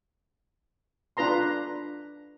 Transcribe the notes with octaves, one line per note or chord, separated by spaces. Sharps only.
D4 F4 B4 A#5 C6